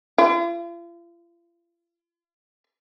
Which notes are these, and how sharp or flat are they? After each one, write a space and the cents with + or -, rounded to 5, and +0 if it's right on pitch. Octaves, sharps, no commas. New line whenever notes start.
F4 -40